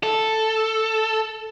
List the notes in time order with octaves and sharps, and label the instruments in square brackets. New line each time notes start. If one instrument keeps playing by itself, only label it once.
[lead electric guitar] A4